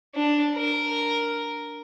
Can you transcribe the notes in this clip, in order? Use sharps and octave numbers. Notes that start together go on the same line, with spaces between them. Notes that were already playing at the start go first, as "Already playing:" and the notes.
D4
A#4